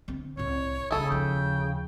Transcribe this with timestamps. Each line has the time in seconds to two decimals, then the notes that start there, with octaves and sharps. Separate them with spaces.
0.08 D3 C4
0.37 C2 A2 C#5
0.91 C#3 A3 D4 E4 A4 D#6
1.10 D#2 F3 G5